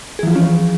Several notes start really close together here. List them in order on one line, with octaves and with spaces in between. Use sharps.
G#4 E3 F3 F4 C#4